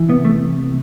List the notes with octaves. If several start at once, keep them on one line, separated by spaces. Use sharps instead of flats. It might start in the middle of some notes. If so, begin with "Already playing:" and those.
Already playing: E3
C3 B3
A3